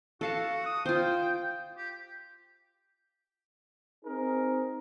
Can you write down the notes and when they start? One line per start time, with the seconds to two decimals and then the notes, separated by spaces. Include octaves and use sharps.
0.21 F#4 A4 F5 A5
0.65 D#6
0.86 F4 C5 G5
1.78 G4
4.05 C4 D#4 G#4 A#4